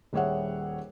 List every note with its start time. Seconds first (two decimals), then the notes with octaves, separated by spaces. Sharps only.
0.13 D#1 G3 G#4 C#5 E5 F#5